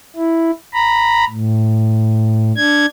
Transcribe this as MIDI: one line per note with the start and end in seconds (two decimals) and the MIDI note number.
0.16 0.51 64
0.74 1.25 82
0.74 1.25 83
1.30 2.52 45
2.56 2.86 62
2.56 2.86 92